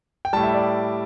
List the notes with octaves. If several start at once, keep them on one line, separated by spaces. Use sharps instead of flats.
G5
A2 G3 A5
E5
D5